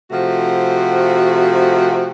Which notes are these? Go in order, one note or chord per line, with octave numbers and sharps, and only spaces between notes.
C3 F3 A3 F#4